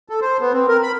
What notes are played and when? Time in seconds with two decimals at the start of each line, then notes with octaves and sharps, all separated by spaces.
0.09 A4
0.21 C5
0.41 B3
0.53 C4
0.68 A#4
0.83 B5